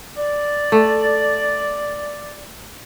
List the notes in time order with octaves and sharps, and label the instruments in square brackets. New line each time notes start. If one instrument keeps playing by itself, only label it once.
[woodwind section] D5
[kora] A3